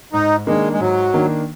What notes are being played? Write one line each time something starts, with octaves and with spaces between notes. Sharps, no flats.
G#2 D#4
D#3 G#3 A#3 D4
G#3
G#2 F#3
D#3 A#3 D4